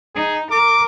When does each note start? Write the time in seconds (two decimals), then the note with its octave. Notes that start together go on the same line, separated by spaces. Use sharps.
0.16 D#4 G#4
0.51 A#4 D6